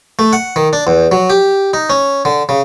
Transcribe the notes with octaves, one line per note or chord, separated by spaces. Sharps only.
A3
F#5
D#3
D4
E2
F#3
G4
D#4
C#4
D3
C#3